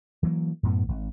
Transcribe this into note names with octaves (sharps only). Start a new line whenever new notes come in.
E3 F#3 A3 A#3
F#2 A2 B3
G#1